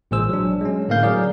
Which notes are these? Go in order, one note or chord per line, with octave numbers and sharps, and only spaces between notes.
A1 A#2 G#3 G#4 C5 E6
F#3 D4
G#3 C#4
A2 D3 A#3 C4 F5 G6
F#3 G#4 A#4 D5 F5